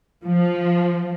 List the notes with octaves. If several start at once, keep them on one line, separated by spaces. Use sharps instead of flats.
F3